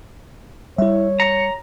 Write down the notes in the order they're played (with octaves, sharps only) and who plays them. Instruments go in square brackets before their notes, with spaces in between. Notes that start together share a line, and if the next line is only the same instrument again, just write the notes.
[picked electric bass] G3 [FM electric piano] E4 E5 [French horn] C#5
[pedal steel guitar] A#5 [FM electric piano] C#7